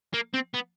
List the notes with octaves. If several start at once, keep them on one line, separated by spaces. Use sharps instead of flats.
A#3
C4
B3